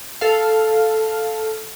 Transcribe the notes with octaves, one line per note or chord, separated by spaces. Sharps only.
A4 F5